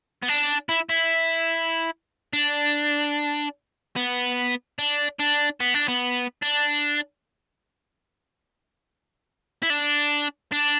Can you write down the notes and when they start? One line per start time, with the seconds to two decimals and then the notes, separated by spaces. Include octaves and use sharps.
0.22 B3
0.28 D4
0.69 E4
0.89 E4
2.33 D4
3.96 B3
4.79 D4
5.20 D4
5.61 B3
5.74 D4
5.88 B3
6.42 D4
9.62 E4
9.70 D4
10.52 D4